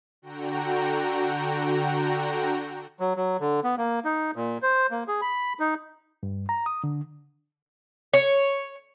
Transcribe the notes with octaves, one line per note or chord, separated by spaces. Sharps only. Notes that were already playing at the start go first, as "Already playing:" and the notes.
D3 F#4 G5 A#5
F#3
F#3
D3
B3
A#3
D#4
A#2
C5
A#3
G#4
B5
D#4
G2
A#5
D#6
D3
C#5